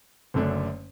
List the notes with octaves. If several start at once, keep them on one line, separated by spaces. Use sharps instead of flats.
F#1 F#2 D3 A3 D4